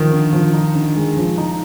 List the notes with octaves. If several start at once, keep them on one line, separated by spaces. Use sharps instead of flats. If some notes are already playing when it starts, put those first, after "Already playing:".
Already playing: D#3 F3
D3
F3
D#4
D3
G#3
F3
D#4